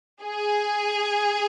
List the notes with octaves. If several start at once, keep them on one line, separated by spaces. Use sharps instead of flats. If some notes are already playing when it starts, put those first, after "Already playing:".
G#4